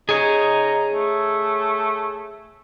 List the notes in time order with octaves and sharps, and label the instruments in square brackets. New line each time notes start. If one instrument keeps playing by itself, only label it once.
[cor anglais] D#4 [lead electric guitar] G#4 C#5
[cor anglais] A3